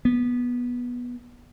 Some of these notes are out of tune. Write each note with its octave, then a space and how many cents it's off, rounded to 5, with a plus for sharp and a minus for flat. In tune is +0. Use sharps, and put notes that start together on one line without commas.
B3 -15